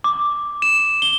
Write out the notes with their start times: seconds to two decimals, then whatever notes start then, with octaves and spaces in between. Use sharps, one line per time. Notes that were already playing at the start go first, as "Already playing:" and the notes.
0.04 D6
0.62 E7
1.02 G7